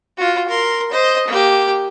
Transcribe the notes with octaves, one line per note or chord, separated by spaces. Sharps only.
F4 F#4
A#4 C6
C5 D#5
A#3 G4